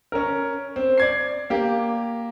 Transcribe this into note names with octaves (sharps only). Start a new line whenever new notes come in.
C#4 A#4
C4
D5 G#6 C7
A#3 G4